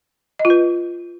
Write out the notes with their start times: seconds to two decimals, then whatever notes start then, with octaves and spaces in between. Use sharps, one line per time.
0.39 D#5
0.45 F4
0.50 B4